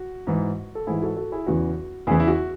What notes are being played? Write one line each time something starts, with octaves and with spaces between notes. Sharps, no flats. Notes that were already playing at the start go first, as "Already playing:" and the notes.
Already playing: F#4
G#2 E3
A4
G#2 E3 E4 G#4
F#4 A4
F#4 A4
E4 G#4
E2 C#3 E3 F#4
E2 C#3 E3 E4 G#4
E4
F#4